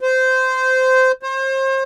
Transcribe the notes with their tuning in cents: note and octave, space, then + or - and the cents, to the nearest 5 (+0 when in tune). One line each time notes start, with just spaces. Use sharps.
C5 -15
C5 +35